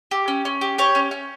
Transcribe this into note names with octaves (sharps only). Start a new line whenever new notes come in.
G4
C#4
C#4
G4
G4 C#5
C#4
C#4